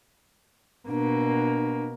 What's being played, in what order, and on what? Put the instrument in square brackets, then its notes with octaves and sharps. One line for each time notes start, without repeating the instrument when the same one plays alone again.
[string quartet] B2 A#3 [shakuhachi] D4